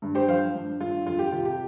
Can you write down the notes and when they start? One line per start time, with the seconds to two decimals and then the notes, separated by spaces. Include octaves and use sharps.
0.02 G2
0.15 G4 C5
0.28 F3 C5 F5
0.54 G2
0.80 G2 F4
1.06 F2 F4
1.19 G4
1.32 C3 F4
1.45 G4